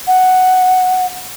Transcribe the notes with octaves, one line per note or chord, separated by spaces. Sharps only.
F#5